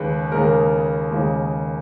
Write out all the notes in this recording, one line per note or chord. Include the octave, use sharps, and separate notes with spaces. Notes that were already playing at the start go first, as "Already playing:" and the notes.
Already playing: D#2 C#3 G#3 B4
D#2 C#3 G#3 A#4
D#2 C#3 G#3